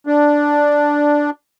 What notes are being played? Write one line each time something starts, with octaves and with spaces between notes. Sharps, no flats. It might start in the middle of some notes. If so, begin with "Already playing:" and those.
D4